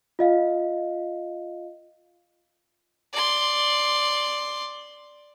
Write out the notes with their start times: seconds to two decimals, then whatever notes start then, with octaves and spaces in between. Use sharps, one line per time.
0.19 F4 D#5 F5
3.13 D5 C6